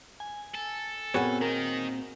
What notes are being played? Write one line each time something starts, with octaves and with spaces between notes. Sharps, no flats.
G#5
A4
A#2 B3 C4 F#4 G#4 C#5
D#3 A#4